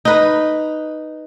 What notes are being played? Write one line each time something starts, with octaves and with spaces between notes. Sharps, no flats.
D#4 B4